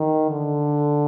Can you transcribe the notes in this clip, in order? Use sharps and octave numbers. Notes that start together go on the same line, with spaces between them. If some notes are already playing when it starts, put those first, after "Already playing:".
Already playing: D#3
D3